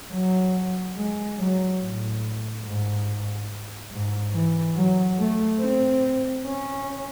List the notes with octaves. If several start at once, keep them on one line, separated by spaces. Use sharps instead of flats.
F#3
G#3
F#3
A2
G#2
G#2
E3
F#3
A3
C4
C#4